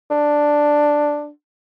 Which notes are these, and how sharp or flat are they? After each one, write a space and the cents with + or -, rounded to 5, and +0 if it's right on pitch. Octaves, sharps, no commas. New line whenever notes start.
D4 +5